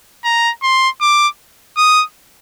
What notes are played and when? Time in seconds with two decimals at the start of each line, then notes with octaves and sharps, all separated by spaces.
0.25 A#5
0.63 C6
1.01 D6
1.77 D#6